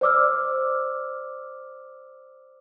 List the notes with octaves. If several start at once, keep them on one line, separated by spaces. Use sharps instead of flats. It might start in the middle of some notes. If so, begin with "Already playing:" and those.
C5 D5 D6 E6 F6